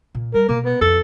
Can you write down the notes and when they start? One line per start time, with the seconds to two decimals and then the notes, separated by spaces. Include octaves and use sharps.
0.15 A#2
0.34 G3 A#4
0.48 B2 A#3
0.65 B3
0.81 F2 F4 A4